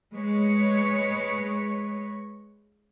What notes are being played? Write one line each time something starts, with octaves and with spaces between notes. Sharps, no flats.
G#3 B4 C#5